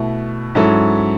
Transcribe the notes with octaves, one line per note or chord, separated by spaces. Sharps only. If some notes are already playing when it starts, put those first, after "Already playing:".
Already playing: B2 A3 E4
G#2 F#3 C#4 E4 A4